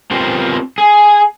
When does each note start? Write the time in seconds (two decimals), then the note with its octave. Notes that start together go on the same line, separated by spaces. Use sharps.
0.11 B3 C4 F4 G4 A#4 C5
0.78 G#4